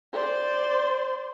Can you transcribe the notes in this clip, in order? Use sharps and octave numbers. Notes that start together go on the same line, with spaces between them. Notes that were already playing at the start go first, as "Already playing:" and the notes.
C5 D5